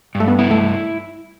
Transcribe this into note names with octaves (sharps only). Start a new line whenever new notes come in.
G2
A3
B3
B3 E4
A3